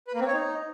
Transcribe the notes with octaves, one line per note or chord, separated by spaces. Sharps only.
B4
A#3
C4
C#5
D#4